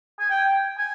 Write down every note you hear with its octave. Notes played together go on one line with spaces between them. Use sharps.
G#5
G5
G#5